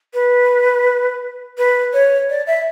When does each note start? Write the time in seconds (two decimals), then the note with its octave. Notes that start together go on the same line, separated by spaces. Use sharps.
0.14 B4
1.58 B4
1.93 C#5
2.30 D5
2.47 E5